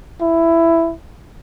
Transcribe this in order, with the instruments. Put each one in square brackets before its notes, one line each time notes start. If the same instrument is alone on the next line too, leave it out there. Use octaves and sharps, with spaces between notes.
[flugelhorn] E4